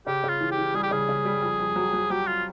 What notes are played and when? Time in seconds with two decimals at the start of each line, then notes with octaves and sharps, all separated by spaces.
0.07 C#3 G4
0.24 C#3
0.29 F4
0.41 E3
0.51 G4
0.58 E3
0.74 G3 G#4
0.83 G4
0.91 C#3 G#4
1.09 C#3
1.25 G3
1.42 F2
1.59 F2
1.76 F#3
1.93 F#3
2.10 F#3 G4
2.27 F4